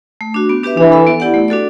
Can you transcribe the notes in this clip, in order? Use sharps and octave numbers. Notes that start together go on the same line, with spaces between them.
A3
D4 F#4
B3
D4 G4 B4 E5
E3 D4
A4 E5
B3
E4 G4 D5 F#5
A3
D4 F#4 A4 D5